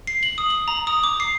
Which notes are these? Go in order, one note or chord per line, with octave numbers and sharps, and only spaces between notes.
C7
F#7
D#6
F#7
A#5
D#6
D6
C7